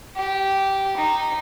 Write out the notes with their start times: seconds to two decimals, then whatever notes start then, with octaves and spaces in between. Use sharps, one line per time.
0.16 G4
0.97 D#4